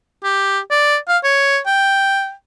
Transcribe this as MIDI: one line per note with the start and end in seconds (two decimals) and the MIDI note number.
0.24 0.59 67
0.71 0.97 74
1.08 1.18 77
1.24 1.59 73
1.66 2.32 79